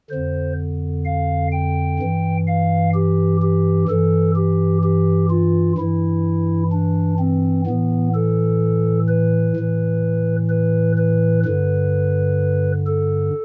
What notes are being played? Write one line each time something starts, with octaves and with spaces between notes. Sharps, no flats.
F2 D3 C5
F5
G5
G2 E3
F5
G4
G4
G2 E3 A4
G4
G4
F4
G2 E3 E4
D4
C4
A2 E3 B3
A4
B4
A2 E3
B4
B4
G2 D3 B4
A4